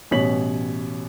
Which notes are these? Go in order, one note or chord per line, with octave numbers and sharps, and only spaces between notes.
A1 B2 G3 C#5 B6 F#7